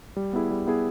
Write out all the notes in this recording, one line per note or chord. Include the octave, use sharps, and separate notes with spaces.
G3
B3 E4 G#4
G3
B3 E4 G#4